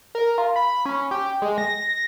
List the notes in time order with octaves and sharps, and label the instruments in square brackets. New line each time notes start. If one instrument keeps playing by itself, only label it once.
[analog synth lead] A#4
F4
B5
C#4
G4
G#3
A#6